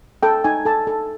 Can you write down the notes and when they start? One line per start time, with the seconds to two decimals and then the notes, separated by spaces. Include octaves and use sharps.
0.23 A4 G5
0.44 D#4 G#5
0.65 A4 A5
0.87 A4